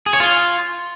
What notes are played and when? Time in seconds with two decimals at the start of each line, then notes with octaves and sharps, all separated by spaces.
0.06 G#4
0.13 C#5
0.20 F4